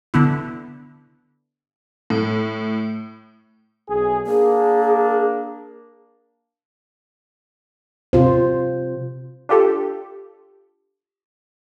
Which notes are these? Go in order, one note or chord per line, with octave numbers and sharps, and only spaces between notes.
D3 B3 E4
A2
B1 G#4
A#3 D4 G#4
C3 F4 C5
D4 F4 G4 A4